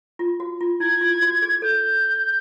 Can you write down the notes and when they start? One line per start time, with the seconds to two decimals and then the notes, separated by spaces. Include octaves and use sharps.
0.19 F4
0.40 F#4
0.61 F4
0.80 E4 G#6
1.01 F4
1.22 F#4
1.42 G#4
1.62 A4 G6